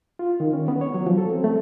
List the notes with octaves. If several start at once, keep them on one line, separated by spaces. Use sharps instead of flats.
F4
D#3
C#4
B3
C#5
F#3
F3
A4
C4
A3